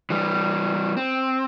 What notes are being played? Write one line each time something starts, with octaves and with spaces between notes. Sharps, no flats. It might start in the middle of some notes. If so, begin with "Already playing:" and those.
E3 G3
C4